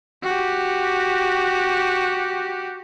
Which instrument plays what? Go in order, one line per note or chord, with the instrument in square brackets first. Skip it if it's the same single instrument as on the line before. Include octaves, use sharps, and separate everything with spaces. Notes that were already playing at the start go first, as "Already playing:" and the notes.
[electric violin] F#4 G4